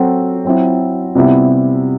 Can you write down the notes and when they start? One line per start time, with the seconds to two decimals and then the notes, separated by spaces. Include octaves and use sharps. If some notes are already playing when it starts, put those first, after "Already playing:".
Already playing: F#3 C4 F#4 A4
0.45 F#3 C4 E4
1.15 C3 G3 B3 E4